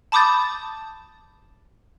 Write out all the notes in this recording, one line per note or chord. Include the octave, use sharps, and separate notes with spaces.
A5 B5 D6 D#6 G6 A6